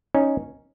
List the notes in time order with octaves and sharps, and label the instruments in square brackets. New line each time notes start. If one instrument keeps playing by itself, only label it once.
[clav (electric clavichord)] C#4 D#4